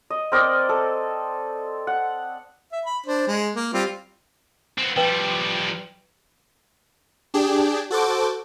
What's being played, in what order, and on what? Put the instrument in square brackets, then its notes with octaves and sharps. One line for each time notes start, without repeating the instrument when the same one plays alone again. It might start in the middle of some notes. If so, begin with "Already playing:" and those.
[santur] D#5
C4 A#4 D5 D#5
A4
F#5
[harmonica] E5
B5
D4 C5
G#3
A#3
G3 C4 F4
[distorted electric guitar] B3 C4
[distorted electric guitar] F3 G3 [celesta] B4 G5
[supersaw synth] D4 G4 G#4
F#4 A4 C5 D6